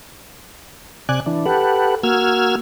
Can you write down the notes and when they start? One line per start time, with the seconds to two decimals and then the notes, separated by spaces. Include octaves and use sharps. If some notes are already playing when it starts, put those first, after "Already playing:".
1.09 C3 D5 G#5 F#6
1.26 E3 D4
1.46 G4 A4 B4 F#5
2.03 A#3 F#4 E6 F6 G#6